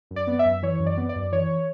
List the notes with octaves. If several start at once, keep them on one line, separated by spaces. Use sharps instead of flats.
F#2
D5
B3
E5
F#2
E3 C#5
F#2
D5
B3
D5
F#2
E3 C#5